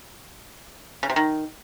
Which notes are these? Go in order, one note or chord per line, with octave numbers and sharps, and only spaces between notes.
C#3
C3
D#3